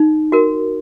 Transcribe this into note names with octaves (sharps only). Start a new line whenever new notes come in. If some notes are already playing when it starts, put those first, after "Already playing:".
Already playing: D#4
F#4 A#4